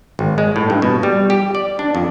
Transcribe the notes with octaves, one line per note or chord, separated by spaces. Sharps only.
G#1
G#3
A2
G2
B2
G3
G4
D5
D4
F2